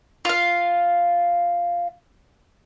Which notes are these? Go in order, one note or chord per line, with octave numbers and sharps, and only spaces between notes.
F4 F5